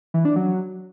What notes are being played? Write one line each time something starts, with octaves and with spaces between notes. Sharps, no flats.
E3
D4
F#3